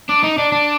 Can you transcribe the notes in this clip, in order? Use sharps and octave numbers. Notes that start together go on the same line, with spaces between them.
D4
D#4
D4
D4